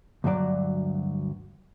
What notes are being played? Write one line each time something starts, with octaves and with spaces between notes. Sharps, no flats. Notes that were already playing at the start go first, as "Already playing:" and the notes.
D2 G2 F#3 D5